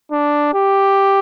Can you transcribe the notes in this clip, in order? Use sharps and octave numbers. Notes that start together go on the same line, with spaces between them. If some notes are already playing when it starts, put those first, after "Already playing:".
D4
G4